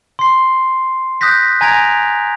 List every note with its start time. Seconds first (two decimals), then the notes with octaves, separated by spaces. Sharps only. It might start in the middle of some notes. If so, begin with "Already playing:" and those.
0.19 C6 C7
1.21 D#6 F#6 G6 A#6 B6
1.61 G#5 A#5 G#6 A#6 D7 F7